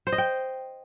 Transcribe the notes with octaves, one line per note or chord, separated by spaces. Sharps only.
C5
D#5
G5